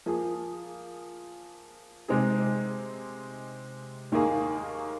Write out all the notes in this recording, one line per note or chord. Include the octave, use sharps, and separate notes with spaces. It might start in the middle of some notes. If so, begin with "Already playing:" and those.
F3 A#3 G#4
C3 G#3 C4 D#4 G#4
D#2 D#3 A#3 G#4